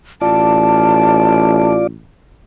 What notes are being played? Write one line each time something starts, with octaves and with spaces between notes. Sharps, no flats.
A1 F4 D5 A5